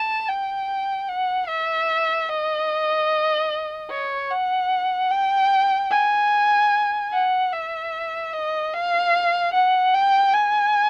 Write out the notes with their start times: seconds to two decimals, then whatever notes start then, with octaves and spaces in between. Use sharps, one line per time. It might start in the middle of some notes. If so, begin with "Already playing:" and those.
Already playing: A5
0.28 G5
1.08 F#5
1.48 E5
2.29 D#5
3.90 C#5
4.30 F#5
5.11 G5
5.91 G#5
7.12 F#5
7.53 E5
8.33 D#5
8.73 F5
9.53 F#5
9.94 G5
10.34 G#5